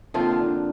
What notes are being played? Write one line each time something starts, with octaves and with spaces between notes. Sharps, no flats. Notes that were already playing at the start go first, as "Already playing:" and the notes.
D3 F3 A#3 C4 F4
D4